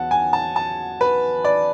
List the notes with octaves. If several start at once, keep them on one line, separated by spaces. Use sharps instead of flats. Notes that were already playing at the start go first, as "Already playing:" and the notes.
Already playing: E2 F#3 B3 F#5 A5
G#5
A5
A5
B4
D5